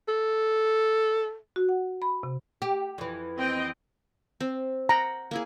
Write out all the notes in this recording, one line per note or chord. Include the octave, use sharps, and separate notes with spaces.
A4
F#4
F#5
B5
C3
G4
F2 E3
C4 D#5 G5
C4
F#5 G5 A#5
A#3 E4 G#4